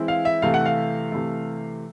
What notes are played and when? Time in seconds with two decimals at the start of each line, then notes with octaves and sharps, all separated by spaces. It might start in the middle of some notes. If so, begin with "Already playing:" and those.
Already playing: E3 G#3 C4 E4
0.08 F5
0.25 E5
0.42 C3 E3 A3 F5
0.54 F#5
0.66 F5
1.12 C3 E3 A3